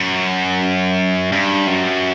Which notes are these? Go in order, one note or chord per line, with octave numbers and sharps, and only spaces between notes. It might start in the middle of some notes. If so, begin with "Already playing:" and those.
Already playing: F#2
G2
F#2